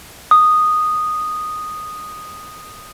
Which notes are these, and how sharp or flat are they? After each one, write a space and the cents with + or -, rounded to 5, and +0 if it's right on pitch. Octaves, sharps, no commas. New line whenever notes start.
D#6 -10